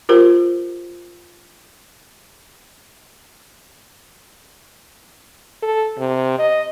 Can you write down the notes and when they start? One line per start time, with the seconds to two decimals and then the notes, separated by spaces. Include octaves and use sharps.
0.09 F4 G4 A#4 C5
5.63 A4
5.98 C3
6.39 D#5